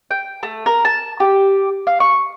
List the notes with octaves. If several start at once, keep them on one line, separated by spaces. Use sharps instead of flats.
G5
A3
A#4
A5
G4
F5
C#6